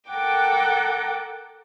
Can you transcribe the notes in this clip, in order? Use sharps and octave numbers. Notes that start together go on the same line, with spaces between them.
A4 A#4 F#5 G5 D6